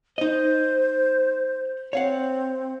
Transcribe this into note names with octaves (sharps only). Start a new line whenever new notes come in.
D#4 C5 D#5
C4 C#5 F5 F#5